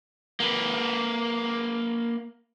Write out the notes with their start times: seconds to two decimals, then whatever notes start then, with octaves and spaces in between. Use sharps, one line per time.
0.40 A#3 B4